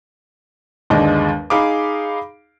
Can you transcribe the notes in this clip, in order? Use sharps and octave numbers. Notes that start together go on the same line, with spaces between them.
G1 D#2 G#3 D4 D#5
D#4 G#4 F5 B5 D6